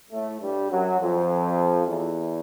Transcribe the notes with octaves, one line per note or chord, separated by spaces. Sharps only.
A2 A3
G2 G3
F#2 F#3
F2 F3
E2 E3